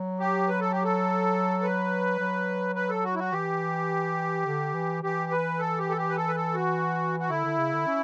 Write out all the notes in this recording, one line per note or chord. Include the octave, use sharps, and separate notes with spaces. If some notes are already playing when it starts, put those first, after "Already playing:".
Already playing: F#3
G4
B4
A4
G4
A4
B4
F#3
B4
A4
F#4
E4
F#4
E3 G4
D3
E3
E3 G4
B4
A4
G4
A4
G4
B4
A4
B4
A4
F#4
F#4
D3 E4
D3
C#3
D3
C#4